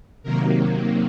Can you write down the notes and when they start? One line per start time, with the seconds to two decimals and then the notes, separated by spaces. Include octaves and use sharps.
0.23 C3 D#3 F#3 A#3 A#4